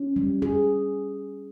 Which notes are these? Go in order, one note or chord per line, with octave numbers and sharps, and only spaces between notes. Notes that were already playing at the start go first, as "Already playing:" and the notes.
Already playing: C#4
G3
G#4